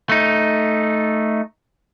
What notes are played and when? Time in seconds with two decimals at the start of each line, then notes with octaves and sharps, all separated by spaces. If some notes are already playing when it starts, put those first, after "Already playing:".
0.09 A3 D#4